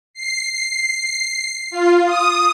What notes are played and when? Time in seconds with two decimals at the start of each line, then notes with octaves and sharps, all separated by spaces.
0.14 C7
1.70 F4
2.05 D#6